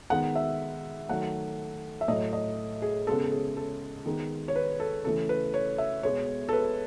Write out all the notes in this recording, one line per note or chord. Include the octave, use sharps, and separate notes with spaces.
D#3 G#3 B3 F#5
E5
D#3 F#3 A3 F#5
E5
A2 F#3 A3 D#5
D#5
G#4
C#3 G#3 B3 A4
A4
G#4
A4
D#3 G#3 B3
C#5
B4
A4
C#3 E3 A3 A4
B4
C#5
E5
B2 G#3 B3 C#5
A4
B4